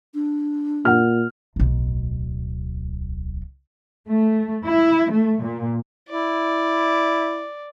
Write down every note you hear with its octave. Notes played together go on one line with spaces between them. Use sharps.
D4
A#2 F#5 F6
D1 B1
A3
E4
A3
A#2
E4 D5